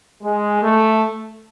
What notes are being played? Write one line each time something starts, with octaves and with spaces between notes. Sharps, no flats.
G#3
A3